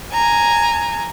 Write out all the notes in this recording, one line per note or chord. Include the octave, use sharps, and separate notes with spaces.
G#5 A#5